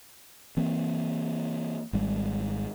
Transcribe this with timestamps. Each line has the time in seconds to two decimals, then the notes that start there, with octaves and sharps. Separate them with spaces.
0.57 E3 A#3 C4
1.93 G#1 G3 G#3